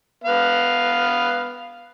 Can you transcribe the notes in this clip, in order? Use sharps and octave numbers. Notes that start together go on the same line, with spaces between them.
B3 B4 F5